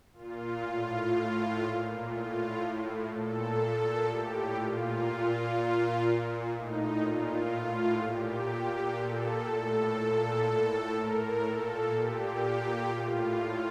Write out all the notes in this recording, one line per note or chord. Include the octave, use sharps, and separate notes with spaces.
A#2 F4
A2 F4
A2
A#2
A2 F4
A2
A#2 A4
A#2 A4
A2 G4
A#2 F4
A#2 F4
A#2
A#2
A2 D#4
A#2 F4
A2
A#2 G4
A#2
A#2 A4
A2 A4
A#2 A4
A2
A2 A#4
A#2 A4
A#2 G4
A#2
A2 F4
A2 F4